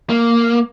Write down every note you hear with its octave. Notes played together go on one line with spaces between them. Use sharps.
A#3